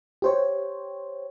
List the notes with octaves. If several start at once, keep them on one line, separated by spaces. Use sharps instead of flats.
G4 C5 C#5